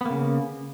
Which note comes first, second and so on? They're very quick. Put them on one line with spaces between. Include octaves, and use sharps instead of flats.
B3 A#3 C#3